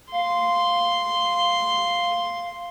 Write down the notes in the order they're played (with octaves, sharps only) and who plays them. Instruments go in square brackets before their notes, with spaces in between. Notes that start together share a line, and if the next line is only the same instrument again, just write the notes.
[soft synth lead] F5 [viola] C6